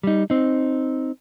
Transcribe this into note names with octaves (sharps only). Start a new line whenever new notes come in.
G3 D#4
C4 D#4